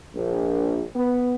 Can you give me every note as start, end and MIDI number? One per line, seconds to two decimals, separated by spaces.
0.16 0.83 34
0.95 1.35 59